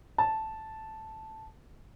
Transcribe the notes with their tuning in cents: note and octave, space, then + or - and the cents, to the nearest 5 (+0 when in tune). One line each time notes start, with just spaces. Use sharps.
A5 -5